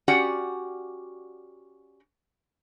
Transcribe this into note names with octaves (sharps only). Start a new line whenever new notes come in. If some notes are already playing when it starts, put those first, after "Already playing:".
C#4 F#4 G4 D5 F#5